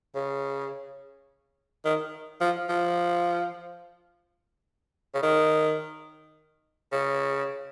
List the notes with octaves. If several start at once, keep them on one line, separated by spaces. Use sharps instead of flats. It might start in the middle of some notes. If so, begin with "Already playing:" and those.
C#3
D#3
F3
F3
C#3
D#3
C#3